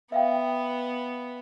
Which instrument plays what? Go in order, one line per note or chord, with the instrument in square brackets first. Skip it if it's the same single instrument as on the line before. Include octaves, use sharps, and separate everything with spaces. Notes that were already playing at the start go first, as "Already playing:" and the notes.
[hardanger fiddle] B3 [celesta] E5 F5 G5